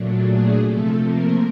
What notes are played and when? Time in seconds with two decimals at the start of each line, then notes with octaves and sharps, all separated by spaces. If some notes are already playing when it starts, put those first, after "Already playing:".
Already playing: A#2 F#3 A3 D4
0.17 G#4
0.56 C3 F3 A3 A4
0.96 A#3 A#4